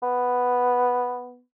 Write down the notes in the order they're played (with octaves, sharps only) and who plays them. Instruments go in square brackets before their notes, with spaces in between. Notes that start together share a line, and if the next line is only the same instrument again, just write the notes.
[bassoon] B3